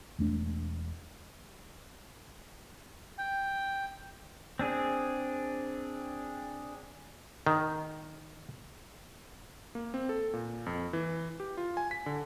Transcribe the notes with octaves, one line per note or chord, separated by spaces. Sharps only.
E1 A3 D4
G5
C4 D4 G#4
D#3
A#3
C4
A4
A#2
F2
E3
G4
F4
G#5
B6
D3